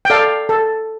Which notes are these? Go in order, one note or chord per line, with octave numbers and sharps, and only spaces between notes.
G5
A4 D5 F5
A4